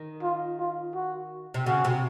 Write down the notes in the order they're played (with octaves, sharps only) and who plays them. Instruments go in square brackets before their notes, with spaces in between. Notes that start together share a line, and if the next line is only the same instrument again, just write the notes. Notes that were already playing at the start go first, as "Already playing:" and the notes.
Already playing: [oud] D#3
[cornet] F4
F4
F#4
[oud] C3
[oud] C#3 [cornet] F#4
[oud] C3